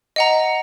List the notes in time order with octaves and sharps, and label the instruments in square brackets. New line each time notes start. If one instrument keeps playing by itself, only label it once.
[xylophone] D#5 F#5 A#5